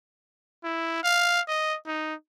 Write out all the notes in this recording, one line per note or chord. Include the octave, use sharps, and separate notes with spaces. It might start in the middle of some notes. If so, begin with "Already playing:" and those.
E4
F5
D#5
D#4